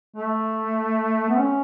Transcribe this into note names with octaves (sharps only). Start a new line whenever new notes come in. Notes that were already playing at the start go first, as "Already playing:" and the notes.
A3
B3
C#4